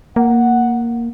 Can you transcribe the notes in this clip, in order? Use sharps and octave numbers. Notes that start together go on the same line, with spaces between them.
A#3 F#5